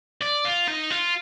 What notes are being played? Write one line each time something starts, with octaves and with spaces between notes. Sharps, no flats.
D5
F4
D#4
F4